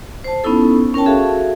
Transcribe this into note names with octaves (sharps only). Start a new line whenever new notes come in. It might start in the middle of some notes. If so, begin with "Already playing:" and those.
C5 A5
B3 C#4 D#4 E4 A4
C#4 A#4 C#5 G5 A5
F#4 G#4 A4 E5 F5